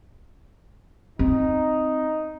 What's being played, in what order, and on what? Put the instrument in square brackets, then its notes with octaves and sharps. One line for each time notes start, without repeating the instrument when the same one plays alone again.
[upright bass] C4 [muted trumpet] D#4